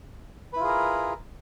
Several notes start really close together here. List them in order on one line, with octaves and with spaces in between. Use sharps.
B4 E4 F4 G#4 A#4